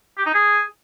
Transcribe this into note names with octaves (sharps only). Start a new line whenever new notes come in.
G4
D#4
G#4